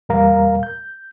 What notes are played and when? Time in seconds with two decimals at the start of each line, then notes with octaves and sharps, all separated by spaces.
0.09 E2 A#2 G3 A#4 F5 A#5
0.63 G6